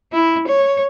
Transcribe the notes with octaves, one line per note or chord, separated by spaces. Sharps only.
E4
C#5